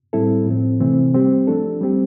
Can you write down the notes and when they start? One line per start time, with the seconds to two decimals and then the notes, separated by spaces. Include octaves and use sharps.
0.13 A2 G3 C4 E4 A4
0.47 A2 F3 C4
0.80 C3 E3 A3 C4
1.14 G3 C4 G4
1.47 F3 A3 D4 A4
1.81 G3 C4 G4